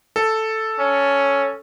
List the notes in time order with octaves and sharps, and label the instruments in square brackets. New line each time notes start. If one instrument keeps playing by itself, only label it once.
[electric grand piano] A4
[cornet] C#4